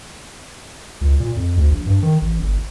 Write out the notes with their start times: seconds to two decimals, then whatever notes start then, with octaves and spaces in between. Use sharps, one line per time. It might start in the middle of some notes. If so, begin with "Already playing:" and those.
1.01 C#2
1.20 A#2
1.36 F2
1.57 D2
1.70 A#1
1.87 G2
2.02 D#3
2.22 A1
2.39 G1